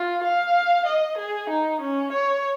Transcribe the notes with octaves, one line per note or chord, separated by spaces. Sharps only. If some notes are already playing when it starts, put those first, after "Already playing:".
Already playing: F4
F5
D#5
G#4
D#4
C#4
C#5